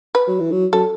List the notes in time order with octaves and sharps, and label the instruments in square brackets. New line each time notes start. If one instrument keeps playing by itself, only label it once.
[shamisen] B4
[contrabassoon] F#3
E3
F#3
[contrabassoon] F#3 [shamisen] A4